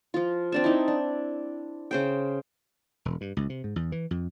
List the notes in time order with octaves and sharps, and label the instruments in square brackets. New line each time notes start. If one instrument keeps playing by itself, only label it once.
[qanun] F3 F4
C4 D4 A5
D#4 E4
D4
C#3 C5 G5
[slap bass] E1
G2
C#2
C3
G#2
E2
E3
F2